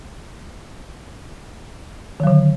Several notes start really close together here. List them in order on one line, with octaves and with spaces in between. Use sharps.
D#3 F#3 D3